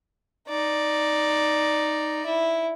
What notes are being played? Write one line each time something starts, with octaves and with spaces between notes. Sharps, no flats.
D#4 D5
E4